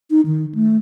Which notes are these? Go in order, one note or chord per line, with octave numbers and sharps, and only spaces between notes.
D#4
D#3
A3